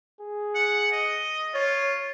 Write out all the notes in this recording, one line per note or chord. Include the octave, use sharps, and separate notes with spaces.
G#4
F#5
D#5
F4 C#5